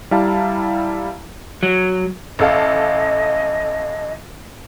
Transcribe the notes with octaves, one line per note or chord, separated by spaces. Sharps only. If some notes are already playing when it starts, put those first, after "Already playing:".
G3 E4 F5 A5 A#5
F#3
A1 A4 D#5 F5